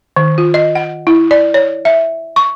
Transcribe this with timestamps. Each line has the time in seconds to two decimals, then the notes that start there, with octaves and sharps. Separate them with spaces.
0.16 D#3
0.38 F4
0.54 D#5
0.75 F#5
1.07 E4
1.31 D5
1.54 C#5
1.85 E5
2.36 C#6